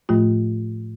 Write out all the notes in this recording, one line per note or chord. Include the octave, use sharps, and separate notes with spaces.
A2 F3 A3 F4